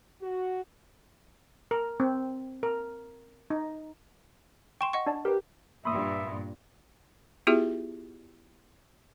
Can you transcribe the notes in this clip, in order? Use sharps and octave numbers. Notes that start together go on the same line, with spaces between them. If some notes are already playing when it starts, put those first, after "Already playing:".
F#4
A#4
C4
A#4
D#4
G5 C6 C#6 E7
D#5 F#5 C#6
D4 D5 A5
G4 A#4 B4
G2 A#2 E5 B5 C6 D#6
B3 E4 F4 G4 G#4 E5